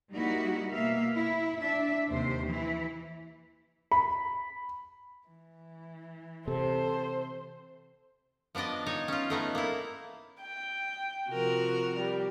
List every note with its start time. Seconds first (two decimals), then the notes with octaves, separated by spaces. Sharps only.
0.12 G3 A#3 D#4 E4 F#4
0.72 B2 A#3 E5 F5
1.13 E4
1.59 D4 E5
2.10 D#2 C3 C5
2.47 E3 E4
3.92 B5
5.27 E3
6.47 C3 A4 C5
8.55 F3 B3 D4 D5 D#5
8.86 D#4 C#5 G#5
9.08 C#4 F4
9.30 A3 B3 D#4
9.55 A#3 E4
10.42 G5
11.30 C3 F3 F#4 A#4
11.98 G3